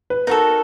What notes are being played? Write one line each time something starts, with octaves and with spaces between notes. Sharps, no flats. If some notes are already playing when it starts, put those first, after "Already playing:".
B4
D#4 F#4 A4 A#4